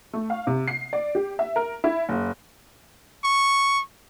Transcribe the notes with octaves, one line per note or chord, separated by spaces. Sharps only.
A3
F5
C3
C7
D5
G4
E5
A#4
E4
F#1
C#6